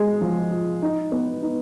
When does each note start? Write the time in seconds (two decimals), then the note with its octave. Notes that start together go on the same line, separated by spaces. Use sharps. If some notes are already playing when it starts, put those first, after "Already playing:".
Already playing: G#3
0.21 F3
0.51 F4
0.82 D#4
1.12 B3
1.42 D#4